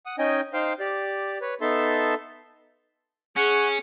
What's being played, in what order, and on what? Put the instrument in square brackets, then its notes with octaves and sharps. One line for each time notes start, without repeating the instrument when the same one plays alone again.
[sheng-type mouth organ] F#5 D#6
C#4 D#4 D#5 G5 G#5
D#4 C5 F5 G5
G4 D5
B4 C#5
B3 D#4 A4 E5 A5 C6
[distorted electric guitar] C#4 [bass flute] G#4 [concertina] F#5 C#6